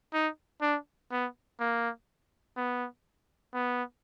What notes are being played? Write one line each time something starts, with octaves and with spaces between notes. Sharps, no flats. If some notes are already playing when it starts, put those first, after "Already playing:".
D#4
D4
B3
A#3
B3
B3